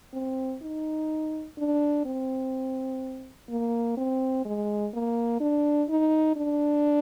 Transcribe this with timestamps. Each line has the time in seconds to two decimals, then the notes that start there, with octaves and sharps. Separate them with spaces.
0.13 C4
0.62 D#4
1.58 D4
2.05 C4
3.49 A#3
3.97 C4
4.45 G#3
4.93 A#3
5.40 D4
5.89 D#4
6.36 D4